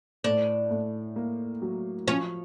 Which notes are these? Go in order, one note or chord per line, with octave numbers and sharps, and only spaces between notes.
A2 D4
A2
A#3
F#3
F3 C#4